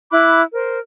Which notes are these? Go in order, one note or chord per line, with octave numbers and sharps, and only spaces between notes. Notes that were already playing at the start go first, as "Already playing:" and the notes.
E4 B5 D6 F#6
A#4 C5